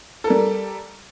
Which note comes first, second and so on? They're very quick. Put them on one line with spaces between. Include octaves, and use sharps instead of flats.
A4 A#4 G3